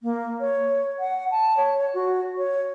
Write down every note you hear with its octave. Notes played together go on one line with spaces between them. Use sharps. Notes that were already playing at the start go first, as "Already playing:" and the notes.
A#3
C#5
F#5
A5
C#5
F#4
C#5